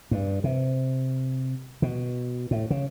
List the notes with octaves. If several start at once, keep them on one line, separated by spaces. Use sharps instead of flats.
G2
C3
B2
A2
C#3